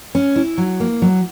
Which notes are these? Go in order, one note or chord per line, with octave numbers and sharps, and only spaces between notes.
C#4
E4
F#3
A#3
F#3